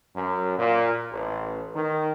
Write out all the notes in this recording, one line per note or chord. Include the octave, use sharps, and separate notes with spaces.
F#2
A#2
A1
D#3